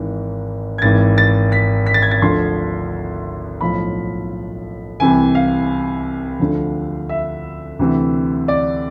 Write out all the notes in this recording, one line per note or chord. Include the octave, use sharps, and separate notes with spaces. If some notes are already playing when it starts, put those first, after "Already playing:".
Already playing: G#1 G#2 E3
G#6
G#1 G#2 E3 A6
A6
B6
B6
A6
G#6
A6
D2 D3 F3 C6
B1 A2 F3 B5
C2 C3 E3 G#5
F5
D2 D3 F3
E5
D2 C3 E3
D5